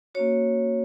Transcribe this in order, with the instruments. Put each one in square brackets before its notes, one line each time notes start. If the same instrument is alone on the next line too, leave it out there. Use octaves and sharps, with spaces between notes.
[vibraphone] A#3 C#4 F#4 C#5